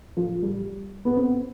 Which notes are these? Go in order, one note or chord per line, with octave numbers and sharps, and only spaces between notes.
F3
G3
B3
C4